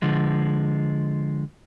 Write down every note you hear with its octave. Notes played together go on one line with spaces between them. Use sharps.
D3 F3 G#3